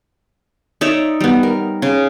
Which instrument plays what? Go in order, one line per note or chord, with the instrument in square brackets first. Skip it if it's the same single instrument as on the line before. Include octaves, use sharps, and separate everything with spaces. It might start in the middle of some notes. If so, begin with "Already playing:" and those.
[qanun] D#4 C#5 D5 E5
G3 B3
A#4
C#3